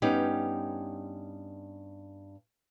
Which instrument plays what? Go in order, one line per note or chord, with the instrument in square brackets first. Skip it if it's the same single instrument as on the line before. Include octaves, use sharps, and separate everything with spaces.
[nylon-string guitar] G2 B3 C#4 D#4 G4